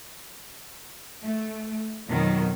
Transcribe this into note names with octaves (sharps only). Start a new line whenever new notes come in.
A3
F2 B2 D#3 F#3